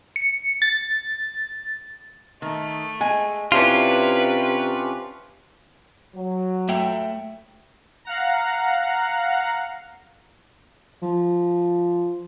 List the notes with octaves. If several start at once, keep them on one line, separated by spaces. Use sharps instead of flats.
C#7
A6
D#3 A3
G#3 G#5
C3 C#4 D4 E4 F4 B4
F#3
A3 E5 G5
F5 F#5 A#5
F3